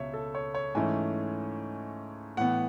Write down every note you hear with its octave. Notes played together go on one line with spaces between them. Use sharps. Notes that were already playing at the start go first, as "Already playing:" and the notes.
Already playing: C#2 B2 C#5 E5
A4
C#5
C#5
G#2 E3 A3 C#4 G#5
A2 E3 B3 F#5